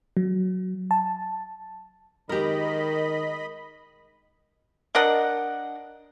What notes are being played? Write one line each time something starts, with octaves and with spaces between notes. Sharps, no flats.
F#3
A5
D#3 G#3 G4 A#4 D#5 B5
D4 A#4 D#5 F#5